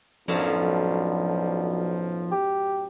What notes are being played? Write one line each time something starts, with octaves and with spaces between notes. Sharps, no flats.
B1 F#2 A2 D3 F3 A5
G4